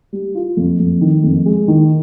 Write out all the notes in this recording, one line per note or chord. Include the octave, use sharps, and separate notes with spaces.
G3
F4
F2
F2
D#3
F2
G#3
D#3